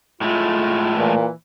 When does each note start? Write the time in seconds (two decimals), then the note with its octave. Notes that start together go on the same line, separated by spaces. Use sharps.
0.21 A2 G#3 A3 F4
0.97 A#2 E3